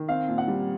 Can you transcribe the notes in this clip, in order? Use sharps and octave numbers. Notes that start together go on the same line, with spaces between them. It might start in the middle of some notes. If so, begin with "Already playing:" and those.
Already playing: D#3
C4 F5
A#2
F#5
G3